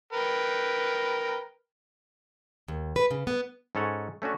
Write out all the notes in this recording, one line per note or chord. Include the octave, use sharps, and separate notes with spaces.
A#4 B4 G5
D#2
B4
C#3
B3
G#2 C#4 A4 C#5 F#5 G#5
A3 C#4 D4 F#4